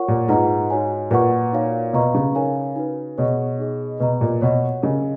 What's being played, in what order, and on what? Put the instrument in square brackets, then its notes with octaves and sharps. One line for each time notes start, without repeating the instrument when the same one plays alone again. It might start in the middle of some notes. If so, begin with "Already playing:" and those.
Already playing: [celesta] F4 A#4 C#5 F#5 C#6
[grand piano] A#2
[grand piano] G#2 [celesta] F4 G#4 B4 F#5 A#5
[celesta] D#4 F#4 C#5 G#5
[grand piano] A#2 [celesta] B4 F#5 C#6
[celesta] D#4 F#4 C#5 F5
[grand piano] B2 [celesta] B4 F5 A#5 C#6
[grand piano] C#3
[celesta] D#4 A#4 C#5 F5 G#5
D#4 F#4 B4
[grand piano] B2 [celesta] G#4 C#5 F#5 C#6
[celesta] D#4 G#4 D#5
[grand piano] B2 [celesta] B4 D#5 A#5
[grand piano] A#2
[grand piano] B2 [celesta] C#5 F#5 C#6
[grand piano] C#3 [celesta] A#4 D#5 G#5